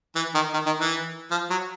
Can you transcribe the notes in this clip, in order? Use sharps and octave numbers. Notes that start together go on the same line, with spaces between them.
E3
D#3
D#3
D#3
E3
F3
F#3